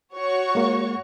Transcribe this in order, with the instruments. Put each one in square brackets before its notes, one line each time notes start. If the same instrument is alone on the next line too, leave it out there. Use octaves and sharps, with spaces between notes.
[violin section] F#4 C#5 C#6
[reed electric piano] G#3 A#3